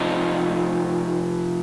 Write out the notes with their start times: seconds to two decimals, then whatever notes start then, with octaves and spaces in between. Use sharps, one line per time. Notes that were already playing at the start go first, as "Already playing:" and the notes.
Already playing: C3 F3 C4 D#4